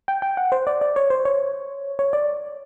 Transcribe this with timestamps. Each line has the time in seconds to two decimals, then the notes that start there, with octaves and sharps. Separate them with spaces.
0.08 G5
0.22 G5
0.37 F#5
0.52 C5
0.67 D5
0.81 D5
0.96 C#5
1.10 C5
1.25 C#5
1.99 C#5
2.13 D5